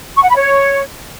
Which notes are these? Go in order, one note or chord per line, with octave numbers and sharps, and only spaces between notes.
C#6
F#5
B5
C#5